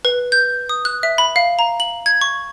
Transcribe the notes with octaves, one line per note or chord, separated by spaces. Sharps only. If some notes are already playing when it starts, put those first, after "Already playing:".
B4
G6
D#6
F#6
E5
B5
F5
A#5
F#7
G#6
C#6